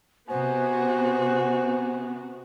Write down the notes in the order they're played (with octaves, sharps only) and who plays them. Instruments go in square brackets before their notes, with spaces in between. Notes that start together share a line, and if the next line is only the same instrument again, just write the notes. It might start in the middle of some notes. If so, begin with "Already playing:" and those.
[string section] C3 B3 [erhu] F#4 [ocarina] C5 [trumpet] G#5